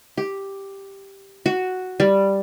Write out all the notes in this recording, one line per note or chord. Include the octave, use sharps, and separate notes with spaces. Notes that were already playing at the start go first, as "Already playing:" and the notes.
G4
F#4
G3